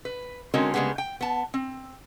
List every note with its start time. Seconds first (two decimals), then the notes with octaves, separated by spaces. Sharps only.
0.05 B4
0.54 D3 G#3 C4 C#4 F#4 A#4
0.74 C#3 G3 G#3 A#3 B3
0.98 G5
1.21 B3 A5
1.54 C4